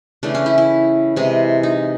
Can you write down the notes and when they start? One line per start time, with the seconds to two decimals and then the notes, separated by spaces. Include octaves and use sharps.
0.23 C#3 E3 A3 D4
0.35 C#4
0.46 E4
0.58 E4
1.16 C3 E3 G#3
1.63 D#4